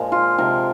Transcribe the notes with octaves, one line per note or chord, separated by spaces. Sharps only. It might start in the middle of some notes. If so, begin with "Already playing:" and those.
Already playing: A#2 F3 G#3
F4
C3 F3 G#3 A#4